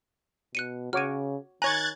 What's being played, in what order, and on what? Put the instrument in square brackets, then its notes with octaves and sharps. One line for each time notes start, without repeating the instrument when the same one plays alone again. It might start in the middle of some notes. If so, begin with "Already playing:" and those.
[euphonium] B2 [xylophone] F#6 C#7 D#7
[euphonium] C#3 [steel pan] F#4 C#5 D6 [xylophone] F6 D#7
[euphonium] D#3 [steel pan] C#5 A#5 [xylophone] G#5 [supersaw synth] F#6 G#6 A6